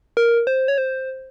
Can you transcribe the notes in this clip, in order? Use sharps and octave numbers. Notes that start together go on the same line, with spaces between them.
A#4
C5
C#5
C5